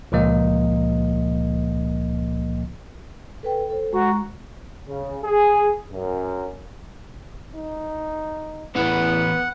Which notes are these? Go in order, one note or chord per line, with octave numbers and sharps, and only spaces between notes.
C#2 A#2 F3 A#3 D#5
A4 B4 G5
A4 C5
G#3 F#4 A#5 C#6
C#3
G#4
F#2
D#4
E2 A2 E3 B3 F#5